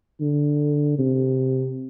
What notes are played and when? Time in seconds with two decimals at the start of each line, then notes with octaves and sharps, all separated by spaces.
0.21 D3
0.98 C3